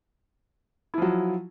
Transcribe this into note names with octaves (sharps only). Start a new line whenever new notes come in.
F3 F#3 E4